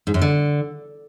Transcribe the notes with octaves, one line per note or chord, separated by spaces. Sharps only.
G#2
F#2
D3